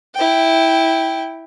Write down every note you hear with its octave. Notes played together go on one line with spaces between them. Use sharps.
E4 G5